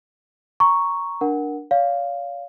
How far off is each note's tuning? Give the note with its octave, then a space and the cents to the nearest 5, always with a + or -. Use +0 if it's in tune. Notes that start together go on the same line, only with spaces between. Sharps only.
A#5 +0 C#6 +0
D4 +0 A#4 +10 F#5 +0
C#5 +45 F5 +0